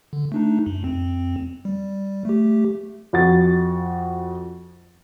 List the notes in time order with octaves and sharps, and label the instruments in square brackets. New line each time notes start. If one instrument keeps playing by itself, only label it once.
[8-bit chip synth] D3
A3 D4 D#4
F#2
F2 C4
G3
A3 G4
[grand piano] F2 F#4 A6